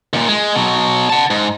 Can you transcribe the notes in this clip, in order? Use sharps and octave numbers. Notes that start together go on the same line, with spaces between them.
D#2 A#2
G#3
B2 F#3
F#5 A5
G#2